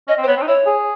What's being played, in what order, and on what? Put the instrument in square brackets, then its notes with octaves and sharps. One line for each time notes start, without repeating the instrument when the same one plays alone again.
[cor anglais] C#4 [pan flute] D#5
[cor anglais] C4
[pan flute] C5
[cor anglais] B3 [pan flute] C#5
[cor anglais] C4
D#4
[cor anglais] E4 [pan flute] C#5
[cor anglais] G#4